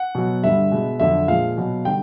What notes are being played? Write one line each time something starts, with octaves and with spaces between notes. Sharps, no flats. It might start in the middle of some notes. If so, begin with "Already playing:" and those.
Already playing: F#5
B2 F#3
G2 D3 G3 E5
B2 G#3
F2 D3 F#3 E5
A#2 F3 G#3 F5
B2 F#3
D3 G3 G5